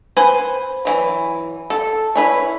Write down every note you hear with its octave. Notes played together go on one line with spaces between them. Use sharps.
B4 C5 F#5 G#5
E3 F#3
A4
C#4 E4 B4